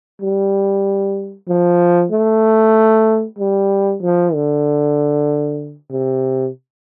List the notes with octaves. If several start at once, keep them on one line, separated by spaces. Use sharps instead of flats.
G3
F3
A3
G3
F3
D3
C3